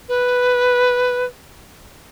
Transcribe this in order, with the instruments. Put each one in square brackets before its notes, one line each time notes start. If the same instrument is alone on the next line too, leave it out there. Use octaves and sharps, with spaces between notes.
[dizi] B4